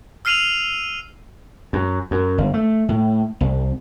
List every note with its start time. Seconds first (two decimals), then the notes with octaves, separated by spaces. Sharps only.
0.25 E6 F6 C7 D#7 F7 F#7
1.73 F#2
2.11 F#2
2.38 G1
2.54 A3
2.89 A2
3.41 C2